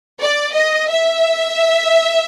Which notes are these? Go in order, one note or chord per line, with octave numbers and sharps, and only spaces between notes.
D5
D#5
E5